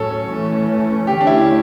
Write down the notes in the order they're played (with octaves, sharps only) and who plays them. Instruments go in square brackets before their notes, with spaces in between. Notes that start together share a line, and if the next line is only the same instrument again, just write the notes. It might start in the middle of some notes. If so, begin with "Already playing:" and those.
Already playing: [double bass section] A2 F#3 C#4 [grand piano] A4 C#5
[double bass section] E3 A3 C#4
[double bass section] D3 A3 C#4 [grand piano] G4
[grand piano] D4
E4